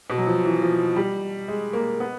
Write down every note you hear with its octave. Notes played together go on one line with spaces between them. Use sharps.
B2
F#3
F3
E3
F3
G3
G#3
A#3
B3